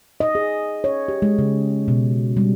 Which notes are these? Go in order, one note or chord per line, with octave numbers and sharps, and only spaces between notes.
D#5
G#4
C#5
G4
G#3
C#3
B2
G3